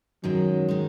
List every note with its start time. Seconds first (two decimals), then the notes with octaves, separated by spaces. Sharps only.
0.24 F#2 D#3 F#3 G#3
0.68 D#3 G#3